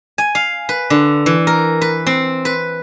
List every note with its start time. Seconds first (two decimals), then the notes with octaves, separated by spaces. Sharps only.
0.18 G#5
0.35 F5
0.69 B4
0.90 D3
1.26 E3
1.47 A#4
1.81 B4
2.07 C4
2.45 B4